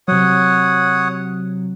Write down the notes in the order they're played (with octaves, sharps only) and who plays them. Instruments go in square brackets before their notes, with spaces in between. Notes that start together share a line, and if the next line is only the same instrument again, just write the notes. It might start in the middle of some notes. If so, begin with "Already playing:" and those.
[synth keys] C3 F#3 [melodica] C#5 F#5 D#6